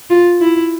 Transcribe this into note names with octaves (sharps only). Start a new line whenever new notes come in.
F4
E4